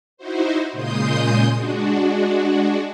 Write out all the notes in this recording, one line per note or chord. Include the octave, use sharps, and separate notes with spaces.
D#4 E4 F#4 C5
A#2 C#3 G#3 C6 D#6 G6
G#3 D4 F#4